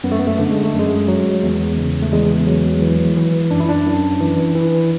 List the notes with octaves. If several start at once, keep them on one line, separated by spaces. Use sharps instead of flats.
F#2 B3
A3
B3
A3
D3
G#3
A3
F#2
G#3
F#3
E2
C#3
A3
E2 G#3
F#3
E3
E3
F#2 D4
E4
D4
F#2
E3
E3